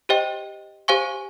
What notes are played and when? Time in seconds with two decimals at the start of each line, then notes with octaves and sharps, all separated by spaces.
0.09 G4 C5 D#5 G5
0.88 G4 C5 F5 G#5 C#6